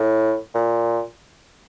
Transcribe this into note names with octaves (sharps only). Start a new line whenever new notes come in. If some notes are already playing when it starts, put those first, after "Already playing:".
Already playing: A2
A#2